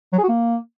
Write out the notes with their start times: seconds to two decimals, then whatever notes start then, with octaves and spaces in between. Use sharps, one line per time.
0.13 F#3
0.18 G#4
0.23 F#4
0.29 A#3